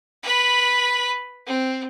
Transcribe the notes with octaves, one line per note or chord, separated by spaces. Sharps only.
B4 B5
C4